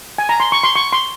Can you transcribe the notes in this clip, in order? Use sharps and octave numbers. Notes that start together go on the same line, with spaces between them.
G#5
A#5
C6
C#6
C6
C#6
C6